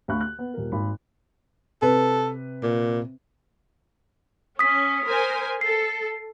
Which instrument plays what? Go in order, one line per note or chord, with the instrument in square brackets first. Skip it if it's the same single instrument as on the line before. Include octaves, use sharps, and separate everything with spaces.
[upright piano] D2 F5 B5 C#6 F#6
F#6
B3
D#1 A#4
G#1 B5
[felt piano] C3 B4 [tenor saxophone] A4
[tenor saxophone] A#2
[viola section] C#4 [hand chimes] D#6 B6
[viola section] A#4 C5 G#5
[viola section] A4 [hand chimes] C7